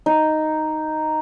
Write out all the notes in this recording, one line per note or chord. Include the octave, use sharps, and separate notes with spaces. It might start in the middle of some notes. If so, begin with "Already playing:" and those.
D#4